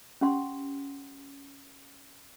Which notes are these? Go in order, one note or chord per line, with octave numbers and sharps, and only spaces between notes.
C#4 G4 F#5 C6